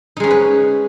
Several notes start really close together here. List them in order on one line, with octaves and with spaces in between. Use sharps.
D#4 G#3 C#4 G#4 B4